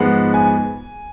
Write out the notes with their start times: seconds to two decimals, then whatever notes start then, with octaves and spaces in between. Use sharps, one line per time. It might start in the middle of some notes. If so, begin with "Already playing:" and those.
Already playing: G#2 F3 G#3 B3 F#5
0.34 G#5